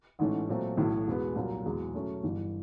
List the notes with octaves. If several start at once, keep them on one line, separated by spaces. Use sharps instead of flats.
A1 G#2 E3 A3 C#4
A#2 F#3 A3 C4
B1 A2 E3
E2 B2 G#3 B3
C2 A#2 F#3 A#3
E2 B2 G#3
B2 F#3 A3 C#4
G1 G2 E3